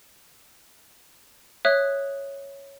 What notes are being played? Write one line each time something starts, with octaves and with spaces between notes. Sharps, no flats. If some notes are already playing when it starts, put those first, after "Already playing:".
C#5 E5 D#6 F#6